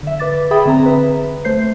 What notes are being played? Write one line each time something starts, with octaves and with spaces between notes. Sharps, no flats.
D3 E5
B4 D6 A6
G#4 E5 G5 B5 D#6
D3 C4 A#5
B4 E5
A3 C5 G6 C7